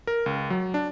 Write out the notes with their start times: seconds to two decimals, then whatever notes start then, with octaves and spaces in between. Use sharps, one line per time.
0.07 A#4
0.26 C#2
0.50 F#3
0.74 D4